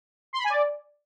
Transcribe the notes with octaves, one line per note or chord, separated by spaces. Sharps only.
C6
B5
G#5
D5